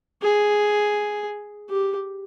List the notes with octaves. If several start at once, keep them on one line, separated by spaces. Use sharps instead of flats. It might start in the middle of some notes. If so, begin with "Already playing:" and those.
G#4
G4